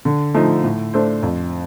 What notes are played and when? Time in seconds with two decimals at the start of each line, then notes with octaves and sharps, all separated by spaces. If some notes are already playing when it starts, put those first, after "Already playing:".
0.05 D3
0.34 F3 A3 D#4
0.64 A2
0.93 A3 D4 A4 C5
1.23 F2